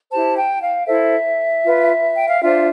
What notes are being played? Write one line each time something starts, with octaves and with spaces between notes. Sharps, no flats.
E4 G4 C5 A5
G5
F5
E4 A4 C5 E5
F4 B4
G5
F5
D4 F4 C5 E5